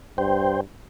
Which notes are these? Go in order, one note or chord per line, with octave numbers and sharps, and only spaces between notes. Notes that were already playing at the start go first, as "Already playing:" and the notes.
G2 C5 G5